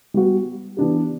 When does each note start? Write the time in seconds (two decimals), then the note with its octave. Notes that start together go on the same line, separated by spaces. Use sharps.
0.14 G3 B3 F#4
0.77 E3 B3 D4 G4